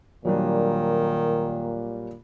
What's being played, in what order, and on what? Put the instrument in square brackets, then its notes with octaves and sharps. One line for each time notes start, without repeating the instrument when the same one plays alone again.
[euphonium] A#2 [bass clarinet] D#3 [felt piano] F#3 G3 D4